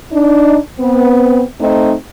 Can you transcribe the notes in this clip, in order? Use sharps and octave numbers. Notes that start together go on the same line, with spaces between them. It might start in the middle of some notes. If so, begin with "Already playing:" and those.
D4 D#4
B3 C4
A3 C4 D#4